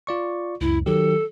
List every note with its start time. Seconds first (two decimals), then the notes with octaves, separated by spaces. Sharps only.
0.07 F4 D5 C#6
0.61 C#2 F#2 E4
0.86 D#3 F#3 G4 A4